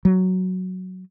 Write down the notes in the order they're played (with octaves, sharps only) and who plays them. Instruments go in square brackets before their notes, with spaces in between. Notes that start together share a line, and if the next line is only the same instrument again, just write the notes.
[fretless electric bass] F#3